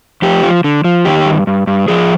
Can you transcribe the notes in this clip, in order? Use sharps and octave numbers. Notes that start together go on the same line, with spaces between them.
F2 G4
F3
D3
F3
D#3 G4
G2
G2
G2
F3 G#4